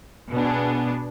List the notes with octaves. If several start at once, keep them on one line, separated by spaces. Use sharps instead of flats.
B2 B3 D4 G#4